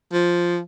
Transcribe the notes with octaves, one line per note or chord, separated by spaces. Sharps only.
F3